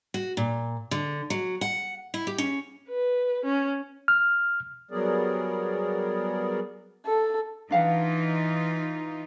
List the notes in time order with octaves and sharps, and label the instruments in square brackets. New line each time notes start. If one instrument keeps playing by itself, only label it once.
[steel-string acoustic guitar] F#4
A#2
D3
F#3
F#5
E4
G4
C#4
[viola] B4
C#4
[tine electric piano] F6
[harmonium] F#3 G3 B3 G#4 A#4 D5
[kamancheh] A4
[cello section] E3 D#4 F4 [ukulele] D4 F5 F#5